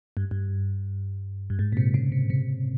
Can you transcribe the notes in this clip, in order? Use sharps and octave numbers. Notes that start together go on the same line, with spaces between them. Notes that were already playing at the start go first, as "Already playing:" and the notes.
G2
G2
G2
G#2
A#2
C3
C#3
C3
C3